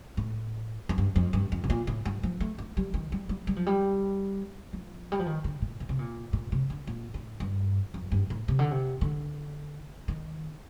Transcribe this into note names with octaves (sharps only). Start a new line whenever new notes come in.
A2
F2
G2
F2
G2
F2
C3
A#2
A2
G2
F3
A3
A3
G3
D#3
G3
G3
G3
F3
G3
F3
G3
F3
D#3
D3
A#2
A#2
C3
A#2
A#2
C3
D3
A#2
A2
G2
F2
G2
A2
C3
D3
C3
D3
D#3